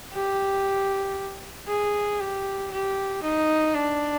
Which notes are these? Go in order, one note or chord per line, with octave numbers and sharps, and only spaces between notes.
G4
G#4
G4
G4
D#4
D4